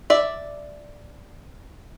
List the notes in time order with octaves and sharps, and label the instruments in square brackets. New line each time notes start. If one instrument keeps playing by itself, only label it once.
[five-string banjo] D5 E5